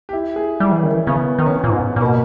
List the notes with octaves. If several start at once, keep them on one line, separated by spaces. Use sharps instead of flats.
G4
E4
G#4
G3 E4
E3
D#3 C#4
E3
C#3 B3
D#3
C#4
B3
A#2
G#2
A#2
B2 A#3